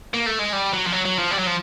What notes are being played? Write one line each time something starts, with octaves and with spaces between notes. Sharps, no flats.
A#3
A3
G#3
G3
F#3
F3
F#3
F#3
F3
G3
F#3
F3